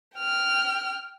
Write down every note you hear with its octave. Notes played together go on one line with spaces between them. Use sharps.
G5 F6